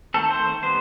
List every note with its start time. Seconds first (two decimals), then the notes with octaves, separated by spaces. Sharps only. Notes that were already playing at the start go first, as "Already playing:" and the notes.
0.14 D#3 A3 C4 A4
0.31 C5
0.62 D#3 G3 B3 C5